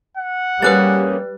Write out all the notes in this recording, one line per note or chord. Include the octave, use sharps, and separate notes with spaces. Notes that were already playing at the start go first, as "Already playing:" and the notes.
F#5
G3 A#3 C#4 G#4 B4 F#6 A6